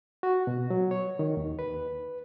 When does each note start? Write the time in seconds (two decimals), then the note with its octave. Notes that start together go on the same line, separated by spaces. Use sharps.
0.23 F#4
0.47 B2
0.70 F#3
0.91 C#5
1.19 D#3
1.37 D#2
1.59 B4